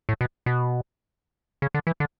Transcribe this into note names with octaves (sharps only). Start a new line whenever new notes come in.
A2
B2
B2
C#3
D3
E3
D3